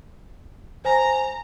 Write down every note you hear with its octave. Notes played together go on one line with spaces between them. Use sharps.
C5 G#5 A#5 A#6